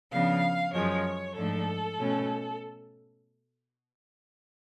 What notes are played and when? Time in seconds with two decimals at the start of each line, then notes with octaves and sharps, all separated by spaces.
0.11 C#3 F3 B3 D4 F5
0.73 F#2 F3 G#3 C#5
1.35 G#2 F3 A3 D4 A4
1.98 B2 A3 C#4